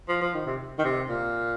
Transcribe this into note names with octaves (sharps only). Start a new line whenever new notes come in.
F3
F3
D#3
C3
D#3
C3
A#2